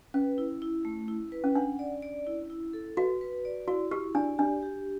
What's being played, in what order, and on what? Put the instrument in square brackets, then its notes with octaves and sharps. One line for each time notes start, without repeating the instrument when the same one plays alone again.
[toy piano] C#4 [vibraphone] B4
[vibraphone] E4
E4
A3
E4
B4
[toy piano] C#4
[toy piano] D4 [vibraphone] F#5
[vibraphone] D5
D5
E4
E4
A4
[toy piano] F#4 [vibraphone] B4
[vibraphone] B4
D5
[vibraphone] E4 [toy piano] F#4
[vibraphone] E4 [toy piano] G4
[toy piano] D4 [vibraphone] D5
[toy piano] D4 [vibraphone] G4
[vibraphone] G4